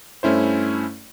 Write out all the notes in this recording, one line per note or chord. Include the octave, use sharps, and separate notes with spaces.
G2 A3 C#4 E4 C5